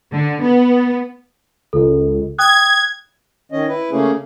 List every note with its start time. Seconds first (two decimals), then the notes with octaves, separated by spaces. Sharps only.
0.12 D3
0.42 B3
1.73 C#2 A4
2.38 G5 D#6 F#6 G#6
3.52 D#3 C#4 D#5
3.69 E4 B4
3.91 C#3 A3 A#3 C#4 G#4